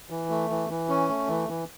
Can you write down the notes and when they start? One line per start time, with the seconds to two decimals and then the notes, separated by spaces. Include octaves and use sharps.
0.10 E3
0.30 A3
0.50 E3
0.69 E3
0.89 C#4
1.09 A3
1.29 E3
1.49 E3